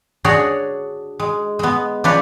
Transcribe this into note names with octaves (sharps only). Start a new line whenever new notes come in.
D4 F#4 G#4 C#5 D5
G#3
G#3 B3
F3 D4 B4 C#5 D5